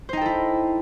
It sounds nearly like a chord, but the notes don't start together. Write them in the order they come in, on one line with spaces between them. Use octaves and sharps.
C5 D#4 G5 A4 E4